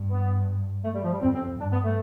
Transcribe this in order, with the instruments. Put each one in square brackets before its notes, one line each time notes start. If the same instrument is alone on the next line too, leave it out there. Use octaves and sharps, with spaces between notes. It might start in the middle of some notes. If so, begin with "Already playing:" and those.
Already playing: [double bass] G2
[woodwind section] B3
A3
G3
F3
G3
[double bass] F2 [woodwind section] C4
[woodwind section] C4
[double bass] G2 [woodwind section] D4
[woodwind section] B3
A3